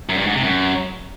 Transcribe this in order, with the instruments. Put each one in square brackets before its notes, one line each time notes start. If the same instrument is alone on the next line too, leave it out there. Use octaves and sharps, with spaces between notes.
[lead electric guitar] F#2
G2
G#2
C3
F#2